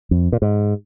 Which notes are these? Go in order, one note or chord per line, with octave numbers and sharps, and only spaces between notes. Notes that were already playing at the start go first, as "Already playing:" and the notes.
F2
A#2
G#2